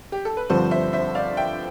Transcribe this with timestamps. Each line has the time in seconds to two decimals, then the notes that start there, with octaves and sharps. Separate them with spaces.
0.12 G4
0.25 A4
0.37 B4
0.50 G2 D3 F3 C4 A4 C5
0.71 C5 E5
0.93 C5 E5
1.15 D5 F5
1.37 E5 G5